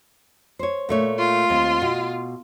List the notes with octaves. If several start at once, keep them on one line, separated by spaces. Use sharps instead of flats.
C5 C#5
A#2 A3 C#5
F4
D#2 C4
B2